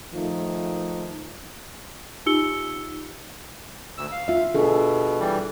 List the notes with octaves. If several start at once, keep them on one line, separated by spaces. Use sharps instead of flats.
D#3 F3 A3 D#4 F4
D#4 F4 G4 E6 C#7 G7
D2 E6
F5
F4 E5
B2 D4 G#4 A4
E3 G3